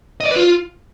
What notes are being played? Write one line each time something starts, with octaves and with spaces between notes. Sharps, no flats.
D#5
D5
B4
F4